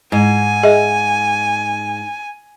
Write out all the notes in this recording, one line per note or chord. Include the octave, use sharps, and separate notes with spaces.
G#2 G#5
G#4 D#5 E5